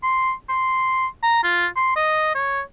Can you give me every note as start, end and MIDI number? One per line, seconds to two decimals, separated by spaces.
0.03 0.33 84
0.49 1.07 84
1.23 1.40 82
1.43 1.67 65
1.76 1.96 84
1.96 2.34 75
2.35 2.61 73